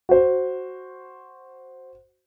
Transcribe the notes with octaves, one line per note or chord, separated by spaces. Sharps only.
F#4 C5